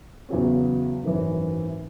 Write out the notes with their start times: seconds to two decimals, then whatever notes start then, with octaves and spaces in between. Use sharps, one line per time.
0.29 E2 C#3 F#3 C#4
1.03 G#1 F#2 E3